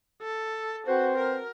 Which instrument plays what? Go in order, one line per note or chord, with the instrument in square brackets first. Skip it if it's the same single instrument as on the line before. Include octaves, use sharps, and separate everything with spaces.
[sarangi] A4
[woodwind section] C4 B4 C5 [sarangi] F#4
[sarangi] A#4